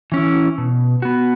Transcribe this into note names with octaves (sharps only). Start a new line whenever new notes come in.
E3 C#4 E4
B2
B3 F#4